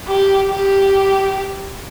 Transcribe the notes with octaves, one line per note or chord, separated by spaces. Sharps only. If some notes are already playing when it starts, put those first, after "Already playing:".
G4
G4